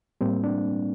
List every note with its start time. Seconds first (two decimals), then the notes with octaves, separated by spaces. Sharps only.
0.21 A2 G3 A#3 C4
0.44 D4